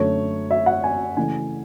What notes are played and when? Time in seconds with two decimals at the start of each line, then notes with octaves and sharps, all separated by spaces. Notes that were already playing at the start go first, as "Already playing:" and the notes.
Already playing: F#2 D3 A3 C#5
0.51 E5
0.66 F#5
0.84 G#5
1.17 C#3 E3 A3 G#5